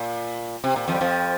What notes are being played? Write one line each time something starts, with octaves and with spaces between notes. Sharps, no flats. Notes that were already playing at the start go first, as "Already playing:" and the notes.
Already playing: A#2
C3
A#2
F2 F3
G3
F2 F3